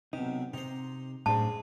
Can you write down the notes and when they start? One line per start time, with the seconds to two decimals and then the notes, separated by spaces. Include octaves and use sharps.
0.13 B1 C3 D#4
0.53 C3 D#4 C5
1.26 F#2 A2 G#3 D4 C5 A5